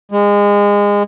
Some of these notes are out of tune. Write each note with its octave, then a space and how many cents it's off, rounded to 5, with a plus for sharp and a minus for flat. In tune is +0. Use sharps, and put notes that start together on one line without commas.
G#3 -25